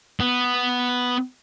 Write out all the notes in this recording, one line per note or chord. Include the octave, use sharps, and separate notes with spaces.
B3